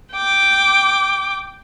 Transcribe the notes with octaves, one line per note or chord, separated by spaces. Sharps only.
G5 D6